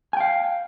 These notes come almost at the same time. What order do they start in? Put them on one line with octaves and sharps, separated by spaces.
G#5 G5 F5